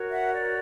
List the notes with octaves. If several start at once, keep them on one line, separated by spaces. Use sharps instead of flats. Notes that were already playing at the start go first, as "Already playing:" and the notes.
Already playing: F#4 A#4 C#5
E5 F#5
D5